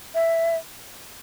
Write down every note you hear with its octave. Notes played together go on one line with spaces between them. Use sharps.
E5